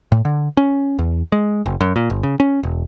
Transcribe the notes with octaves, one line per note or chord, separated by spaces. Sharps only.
A2
D3
C#4
E2
G#3
F#1
F#2
A#2
G1
C#3
C#4
E1